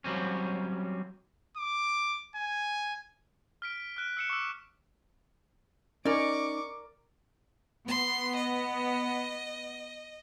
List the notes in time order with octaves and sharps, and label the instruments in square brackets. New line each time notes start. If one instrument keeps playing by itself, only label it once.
[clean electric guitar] F#3 G3 C4 C#4
[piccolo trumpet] D6
G#5
[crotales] F6 B6 D7
F6 F#6 D7
E6 C#7 E7
C#6 D6 E6
[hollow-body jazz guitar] C#4 D#4 G#5 [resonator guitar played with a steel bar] A#4 D5 [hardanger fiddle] C#6 D6
[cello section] B3 [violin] C6
[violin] D#5